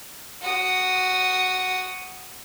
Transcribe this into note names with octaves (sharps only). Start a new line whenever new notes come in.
F#4 D#6